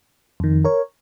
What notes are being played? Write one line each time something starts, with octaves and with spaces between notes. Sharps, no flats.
F2 D#3
A#4 C#5